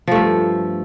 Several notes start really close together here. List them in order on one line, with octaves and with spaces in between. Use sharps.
F3 A3 G2